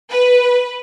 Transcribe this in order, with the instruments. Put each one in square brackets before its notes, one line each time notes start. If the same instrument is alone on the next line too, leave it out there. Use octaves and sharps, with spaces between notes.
[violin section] B4